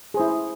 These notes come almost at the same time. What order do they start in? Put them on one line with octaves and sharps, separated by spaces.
G#4 C5 E4